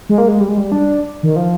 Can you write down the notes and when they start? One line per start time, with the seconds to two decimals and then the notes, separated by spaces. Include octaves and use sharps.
0.09 G#3
0.18 A#3
0.28 G#3
0.41 G3
0.48 G#3
0.57 G3
0.72 D4
1.23 D#3
1.36 F3